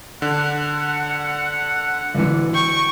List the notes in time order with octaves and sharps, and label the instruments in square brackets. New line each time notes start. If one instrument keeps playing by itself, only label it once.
[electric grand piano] D3 [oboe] F#5
[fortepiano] D2 E3
[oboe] G5 [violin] C#6